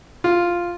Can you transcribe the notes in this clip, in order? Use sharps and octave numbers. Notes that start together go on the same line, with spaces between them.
F4